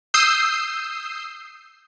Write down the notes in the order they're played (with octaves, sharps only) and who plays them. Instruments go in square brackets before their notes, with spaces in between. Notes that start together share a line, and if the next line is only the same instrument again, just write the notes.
[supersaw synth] D#6 E6 G6 C7